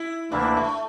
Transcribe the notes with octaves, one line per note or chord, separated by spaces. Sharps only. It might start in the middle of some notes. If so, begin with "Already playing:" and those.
Already playing: E4
D2 C3 E3 A#3 D4 E4
A3